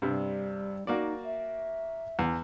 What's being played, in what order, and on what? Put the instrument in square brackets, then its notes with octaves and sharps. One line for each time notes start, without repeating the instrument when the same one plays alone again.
[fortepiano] G2 C3 [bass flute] G3
[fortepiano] A#3 F#4 D5 [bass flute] D#4
[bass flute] E5
[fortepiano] E2